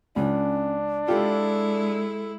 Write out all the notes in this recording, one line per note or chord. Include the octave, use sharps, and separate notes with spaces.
C#2 C#4 D4
G#3 E4 F4 G4 A4